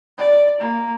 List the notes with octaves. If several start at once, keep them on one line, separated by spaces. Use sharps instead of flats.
D5
A#3